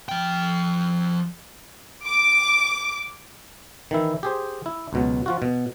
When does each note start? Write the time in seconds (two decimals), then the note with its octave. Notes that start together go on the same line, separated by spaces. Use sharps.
0.09 F3 G5
2.07 D6
3.91 D#3 E3 E4
4.23 G4 G#4 C5
4.66 E4
4.93 C#2 B2 F#3
5.26 F3 F4 F#4
5.42 B2